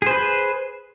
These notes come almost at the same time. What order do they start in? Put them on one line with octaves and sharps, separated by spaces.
G#4 C5 B4